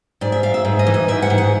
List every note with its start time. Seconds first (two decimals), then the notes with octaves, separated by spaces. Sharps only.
0.21 G#2 D5
0.32 E5
0.43 G#2 F5
0.54 E5
0.65 G#2
0.79 D#5
0.87 E3
0.94 D#5
1.08 G#2 E5
1.22 F#5
1.30 G#2
1.38 F#5